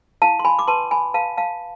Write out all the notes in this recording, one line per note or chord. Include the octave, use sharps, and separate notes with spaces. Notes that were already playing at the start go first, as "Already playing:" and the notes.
E4 F5 A5
C6
G#5 B5
D6
B4 A5 C6
G#5 B5
B4 F5 A5
F5 A5